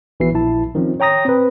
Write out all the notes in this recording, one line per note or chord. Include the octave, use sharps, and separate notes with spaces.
A#1 E3 B3 E4 F#4 C7
A#1 E4 A5
D#3 F3 C4 C#4
C#5 G5 A#5 D#6 A#6
C4 B4